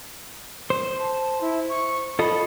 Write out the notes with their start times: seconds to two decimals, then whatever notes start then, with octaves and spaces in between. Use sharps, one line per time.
0.70 C5
1.00 A5
1.41 E4
1.69 C#6
2.19 F4 A4 D#5 B5